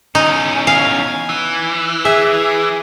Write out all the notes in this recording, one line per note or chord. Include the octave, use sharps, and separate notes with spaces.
E2 C#4 D#4
F5 G#5
E3
G#4 E5